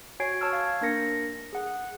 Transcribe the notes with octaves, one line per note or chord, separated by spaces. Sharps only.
F#4 C#5 G#5 G#6 C7 D7
C#5 A5 C#6 E6 F6
F5 G#6
A#3 D4 A#4 A#6 C#7
G#4 F#5